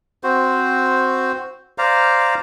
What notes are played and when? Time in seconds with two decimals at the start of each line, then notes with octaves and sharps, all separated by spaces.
0.24 C4 F#4 C5
1.78 C5 D5 F5 A#5